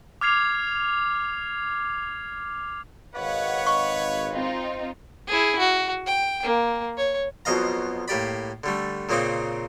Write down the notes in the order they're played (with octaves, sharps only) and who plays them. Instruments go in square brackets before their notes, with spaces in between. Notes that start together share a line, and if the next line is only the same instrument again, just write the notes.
[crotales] D6 F6 G#6 C7 F7
[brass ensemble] G#1 D#5 F5 [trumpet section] B4 C#5 [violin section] F#5
[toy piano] C#6
[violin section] C4 D#4 F4
[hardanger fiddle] E4 G#4
F#4
G5
A#3
C#5
[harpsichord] B1 F2 B2 D#5 F5 A#5
A2 A#3 G4 D5 B5
D3 G3 A3
A#2 C#3 A#3 C4 D#4 D6